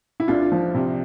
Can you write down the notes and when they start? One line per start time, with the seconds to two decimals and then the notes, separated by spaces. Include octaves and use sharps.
0.20 E4
0.28 C2 D4 F4
0.52 F3
0.74 C3